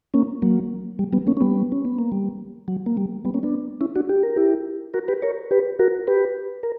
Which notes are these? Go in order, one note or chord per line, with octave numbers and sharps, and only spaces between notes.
A#3 C#4
F#3 A#3
G3
G3 B3
A#3 C#4
C#4
G3 B3
C#4
B3
A#3
G3
F#3
A#3
G3
G3 B3
A#3 C#4
B3 D4
C#4 E4
D4 F#4
G4
A#4
E4 G4
F#4 A#4
G4 B4
A#4 C#5
G4 B4
F#4 A#4
G4 B4
A#4